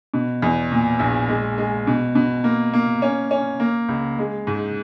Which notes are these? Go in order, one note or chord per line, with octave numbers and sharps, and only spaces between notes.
B2
E2
A#2
A#1
G#3
G#3
B2
B2
A#3
A#3
C#4
C#4
A#3
C#2
G#3
G#2